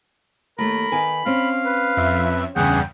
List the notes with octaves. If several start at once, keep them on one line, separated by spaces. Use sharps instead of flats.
D#2 A3 A#4 B5
D#3 B3 G#5
C4 C#4 F5
B4
F2 E5
E2 G2 C#3 G#4 F#5 G5